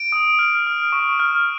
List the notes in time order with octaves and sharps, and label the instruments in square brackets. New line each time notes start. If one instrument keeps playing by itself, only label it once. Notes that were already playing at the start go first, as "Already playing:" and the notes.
Already playing: [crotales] D7
D#6
F6
F6
C#6
F6